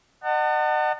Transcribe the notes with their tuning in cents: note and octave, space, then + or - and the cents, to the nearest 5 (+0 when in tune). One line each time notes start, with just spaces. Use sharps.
D#5 -35 F#5 +15 A5 +35